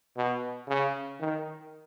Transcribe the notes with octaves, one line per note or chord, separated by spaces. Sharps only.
B2
C#3
D#3